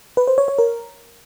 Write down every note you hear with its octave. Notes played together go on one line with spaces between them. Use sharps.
B4
C5
C#5
C#5
A#4